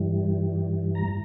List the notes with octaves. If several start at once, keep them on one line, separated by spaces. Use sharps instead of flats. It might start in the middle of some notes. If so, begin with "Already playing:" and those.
Already playing: G2 E3 G3
A#5